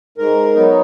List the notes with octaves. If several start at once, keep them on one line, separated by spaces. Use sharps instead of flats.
G#2 A#4
F#3 B3 D#4